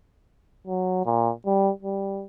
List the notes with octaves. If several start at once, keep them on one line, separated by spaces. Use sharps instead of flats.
F#3
A#2
G3
G3